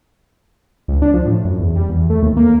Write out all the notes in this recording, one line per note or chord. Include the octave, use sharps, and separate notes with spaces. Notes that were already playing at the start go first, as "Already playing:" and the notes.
C#2
D4
F3
A2
F#2
E2
G3
E2
A3
D#2
A#3